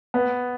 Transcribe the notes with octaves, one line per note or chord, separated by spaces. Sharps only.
B3